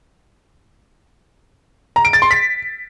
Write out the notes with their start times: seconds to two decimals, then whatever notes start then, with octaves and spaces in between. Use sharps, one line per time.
1.96 A#5
2.05 D7
2.13 A6
2.22 C6
2.31 B6